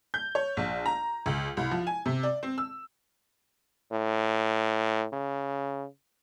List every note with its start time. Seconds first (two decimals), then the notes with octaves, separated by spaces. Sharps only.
0.14 G6
0.35 C#5
0.57 A#1
0.86 A#5
1.26 C#2
1.57 C2
1.71 F3
1.87 G#5
2.06 C3
2.23 D5
2.43 C4
2.58 E6
3.92 A2
5.13 C#3